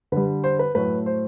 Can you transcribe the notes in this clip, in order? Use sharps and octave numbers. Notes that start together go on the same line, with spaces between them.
D3 G3 B4
C5
B4
A2 F#3 A3 B4
C5